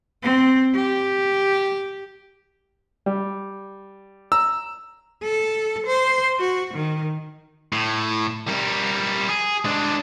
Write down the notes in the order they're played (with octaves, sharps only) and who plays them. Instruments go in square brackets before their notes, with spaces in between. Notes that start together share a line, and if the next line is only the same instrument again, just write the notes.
[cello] C4
G4
[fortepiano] G3
[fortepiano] A#5 [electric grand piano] E6
[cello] A4
C5
F#4
D#3
[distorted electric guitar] A2
G3 A#4
G#4
G#3 D4